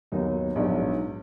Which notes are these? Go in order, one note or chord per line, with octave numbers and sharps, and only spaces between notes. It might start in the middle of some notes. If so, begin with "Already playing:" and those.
D#2 D#3 F#3 B3 D#4
A#1 G#2 F#3 B3 D#4